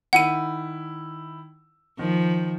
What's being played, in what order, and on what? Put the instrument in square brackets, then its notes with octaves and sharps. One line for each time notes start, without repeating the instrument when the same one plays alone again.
[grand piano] D#3 E4 [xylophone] F#5 D#7
[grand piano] D#3 [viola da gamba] F3